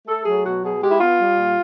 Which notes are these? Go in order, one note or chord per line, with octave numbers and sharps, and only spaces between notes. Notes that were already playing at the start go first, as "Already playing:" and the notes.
A3 A4
F#3 G#4
B2 F#4
B2 G#4
G#3 G4
E4
B3 F4
G3
A#2